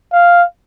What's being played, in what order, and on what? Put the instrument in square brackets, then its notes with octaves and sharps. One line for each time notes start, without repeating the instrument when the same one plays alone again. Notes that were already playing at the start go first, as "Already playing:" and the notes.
[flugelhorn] F5